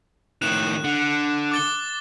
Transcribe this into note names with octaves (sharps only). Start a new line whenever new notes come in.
A2 D#3 F#6 E7
D3
D6 A6 G7